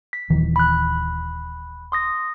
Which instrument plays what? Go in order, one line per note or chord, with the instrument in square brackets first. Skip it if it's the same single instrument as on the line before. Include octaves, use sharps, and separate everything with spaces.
[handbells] B6
[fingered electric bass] D#1 D#3 E3
[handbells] B5 F#6
C6 D#6 A#6